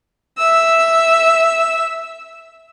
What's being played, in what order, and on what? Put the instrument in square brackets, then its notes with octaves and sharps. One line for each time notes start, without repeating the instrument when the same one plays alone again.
[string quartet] E5 E6